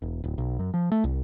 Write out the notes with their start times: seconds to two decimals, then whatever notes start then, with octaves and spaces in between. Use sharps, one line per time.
0.02 E1
0.24 D1
0.38 B1
0.59 F#2
0.74 F3
0.92 A3
1.04 C2